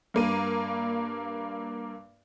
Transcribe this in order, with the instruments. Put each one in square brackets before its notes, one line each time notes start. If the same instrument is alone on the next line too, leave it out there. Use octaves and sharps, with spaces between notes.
[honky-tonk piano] G2 A#3 D#7